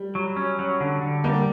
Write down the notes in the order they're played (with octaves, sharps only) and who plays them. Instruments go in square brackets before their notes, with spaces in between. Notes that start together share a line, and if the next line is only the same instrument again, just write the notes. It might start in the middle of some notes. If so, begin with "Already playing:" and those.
Already playing: [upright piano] G3
[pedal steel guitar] F#3
C#4
F#3
D3
D3
[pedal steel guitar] G3 [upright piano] A#3